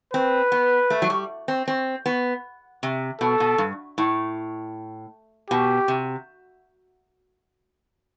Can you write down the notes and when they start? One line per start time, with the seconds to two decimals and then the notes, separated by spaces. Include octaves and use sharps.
0.14 C4 B4
0.52 B3
0.90 A3
1.02 F#3
1.10 G3
1.48 C4
1.68 C4
2.06 B3
2.83 C3
3.20 B2 A4
3.40 B2
3.58 G2
3.98 A2
5.50 B2 G4
5.88 C3